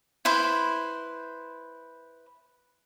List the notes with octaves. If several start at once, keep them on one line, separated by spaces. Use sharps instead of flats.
E4 B4 C5